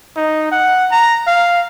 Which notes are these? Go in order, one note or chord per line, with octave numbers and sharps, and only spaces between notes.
D#4
F#5
A#5
F5